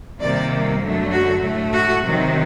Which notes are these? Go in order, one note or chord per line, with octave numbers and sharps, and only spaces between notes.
C3 D#3 G3 A#3 D5
F#2 D3 F#3 A3
F#4
A2 A3
F#4
C3 D#3 F#3